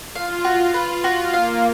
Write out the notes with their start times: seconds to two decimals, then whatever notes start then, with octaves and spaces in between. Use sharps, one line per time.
0.15 F4 F5
0.44 F#4
0.74 B4
1.04 F4 F#4
1.33 A#3 F5